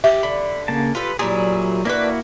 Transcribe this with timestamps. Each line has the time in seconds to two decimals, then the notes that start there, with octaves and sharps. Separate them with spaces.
0.04 G4 E5
0.23 D3 B5
0.68 C#3 A#3 A5
0.95 F4 G4 A4 B4
1.19 A#2 F#3 G3 E4 G#4
1.85 A#3 D4 E4 F#4 B4